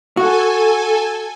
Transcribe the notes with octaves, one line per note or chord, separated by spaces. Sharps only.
F#4 A4 G#5